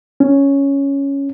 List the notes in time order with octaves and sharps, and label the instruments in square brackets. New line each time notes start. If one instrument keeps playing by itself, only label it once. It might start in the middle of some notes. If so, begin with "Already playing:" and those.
[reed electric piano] C#4